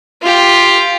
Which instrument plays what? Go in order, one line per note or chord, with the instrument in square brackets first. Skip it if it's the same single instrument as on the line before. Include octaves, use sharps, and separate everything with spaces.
[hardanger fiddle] F4 G4